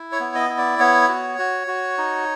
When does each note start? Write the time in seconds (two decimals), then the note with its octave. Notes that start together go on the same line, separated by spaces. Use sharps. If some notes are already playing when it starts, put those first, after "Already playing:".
Already playing: E4
0.12 C#5
0.20 B3
0.35 D#5
0.49 E4
0.58 D5
0.79 B3 C#5
1.08 F#4
1.38 F#4
1.67 F#4
1.98 D#4